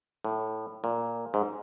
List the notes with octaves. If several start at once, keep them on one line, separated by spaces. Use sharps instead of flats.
A2
A#2
G#2